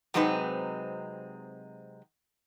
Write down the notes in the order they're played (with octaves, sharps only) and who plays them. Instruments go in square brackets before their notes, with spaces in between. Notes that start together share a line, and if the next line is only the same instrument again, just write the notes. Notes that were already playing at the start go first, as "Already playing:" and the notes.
[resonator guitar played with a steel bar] C3 F#3 G#3 C4 D#4 B4